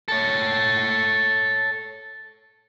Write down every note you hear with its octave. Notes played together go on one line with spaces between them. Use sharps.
A4 C#5